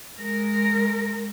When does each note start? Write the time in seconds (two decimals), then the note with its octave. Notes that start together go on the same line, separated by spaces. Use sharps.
0.19 G#3 A#4